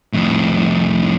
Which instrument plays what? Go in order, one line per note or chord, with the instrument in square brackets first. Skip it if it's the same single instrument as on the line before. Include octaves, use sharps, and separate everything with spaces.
[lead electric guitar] F2 A2